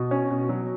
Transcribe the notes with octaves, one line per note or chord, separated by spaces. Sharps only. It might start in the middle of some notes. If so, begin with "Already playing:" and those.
Already playing: B2
C#4
B2
F#3